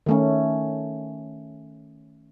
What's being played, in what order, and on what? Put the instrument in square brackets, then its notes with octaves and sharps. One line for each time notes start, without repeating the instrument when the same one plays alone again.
[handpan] D#3 A3 C#4